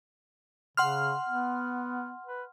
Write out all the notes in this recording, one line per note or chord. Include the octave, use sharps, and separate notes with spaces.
C#3 F#5 C6 F6
B3
B4